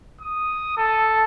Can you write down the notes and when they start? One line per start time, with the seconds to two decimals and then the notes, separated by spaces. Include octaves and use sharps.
0.21 D#6
0.77 A4